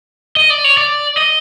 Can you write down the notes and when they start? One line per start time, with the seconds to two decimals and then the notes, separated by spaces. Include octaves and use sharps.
0.37 D#5
0.50 D5
0.64 C#5
0.78 D5
1.17 D#5